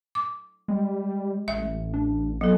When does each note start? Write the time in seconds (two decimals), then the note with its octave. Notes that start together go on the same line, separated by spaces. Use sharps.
0.15 D6
0.68 G3 G#3
1.48 A1 E5
1.94 D4
2.41 F#3 B3 A4